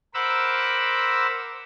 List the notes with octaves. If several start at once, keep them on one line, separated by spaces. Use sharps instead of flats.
A#4 C5 F#5 B5 D6 E6